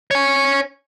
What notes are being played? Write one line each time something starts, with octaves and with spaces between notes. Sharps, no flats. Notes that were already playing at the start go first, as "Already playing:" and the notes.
C#5 G#5